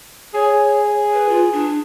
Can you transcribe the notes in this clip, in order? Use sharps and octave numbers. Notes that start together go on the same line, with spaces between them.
G#4 C#5
B4
F4
D4